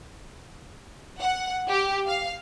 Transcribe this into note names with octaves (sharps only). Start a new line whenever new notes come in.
F#5
G4
F5